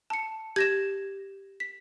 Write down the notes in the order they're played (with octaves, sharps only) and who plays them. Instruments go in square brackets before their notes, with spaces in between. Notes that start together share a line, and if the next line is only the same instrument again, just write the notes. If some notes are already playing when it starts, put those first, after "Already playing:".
[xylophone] A5 C#7
[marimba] G4 [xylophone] G#6 A#6 E7
[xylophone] B6